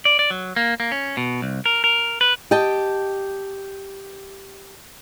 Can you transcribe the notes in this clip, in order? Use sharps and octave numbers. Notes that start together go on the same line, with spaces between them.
D5
D5
F#3
A#3
A#3
C#4
B2
C2
A#4
A#4
B4
G4 D#5 G5 A5